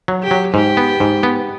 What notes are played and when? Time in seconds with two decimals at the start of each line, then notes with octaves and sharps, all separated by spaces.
0.08 F#3
0.23 G4
0.31 F#3
0.54 G#2 G4
0.77 B3
1.00 G#2
1.23 B3